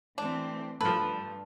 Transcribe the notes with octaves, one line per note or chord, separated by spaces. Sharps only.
E3 A3 C4 D4
G2 F3 A3 B4 A5